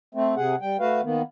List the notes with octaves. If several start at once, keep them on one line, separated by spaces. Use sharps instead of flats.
A3 C4
C3 G#4 F#5
G3 G5
A3 F#4 B4 F5
D#3 A#3 B3